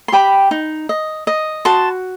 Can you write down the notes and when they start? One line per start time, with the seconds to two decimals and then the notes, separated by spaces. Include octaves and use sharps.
0.08 C6
0.12 G4 G5 B5
0.51 D#4
0.89 D#5
1.27 D#5
1.65 F#4 A5 C6